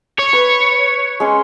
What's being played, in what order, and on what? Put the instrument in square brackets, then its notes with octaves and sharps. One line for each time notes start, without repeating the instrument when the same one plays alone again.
[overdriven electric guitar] C#5
[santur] B4
G#3 C#4 C6